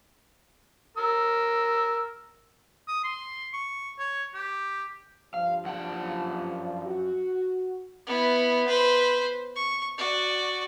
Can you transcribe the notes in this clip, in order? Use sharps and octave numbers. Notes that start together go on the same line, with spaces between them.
A#4 E6
D#6
C6
C#6
C#5
G4
G2 F3 F5
F#2 F#5 A5
F#4
B3 E4
B4 C5
C#6
F#4 D5